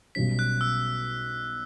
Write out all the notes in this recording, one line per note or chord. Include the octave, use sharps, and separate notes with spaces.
B1 B2 G3 C#4 B6
F#6
E6